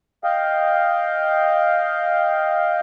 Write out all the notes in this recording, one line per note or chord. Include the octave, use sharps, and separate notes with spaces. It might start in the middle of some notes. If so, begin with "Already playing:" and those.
D#5 F5 G5